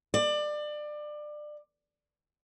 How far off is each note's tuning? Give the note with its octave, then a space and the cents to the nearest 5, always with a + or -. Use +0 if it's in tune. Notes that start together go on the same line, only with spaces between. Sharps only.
D5 +25